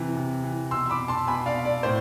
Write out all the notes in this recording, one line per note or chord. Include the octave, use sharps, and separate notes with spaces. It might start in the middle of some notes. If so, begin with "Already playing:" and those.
Already playing: C3 E3
C3
E3
B2 C6 E6
B5 D6
A5 C6
B2 G#5 B5
D5 F5
D5
A2 C5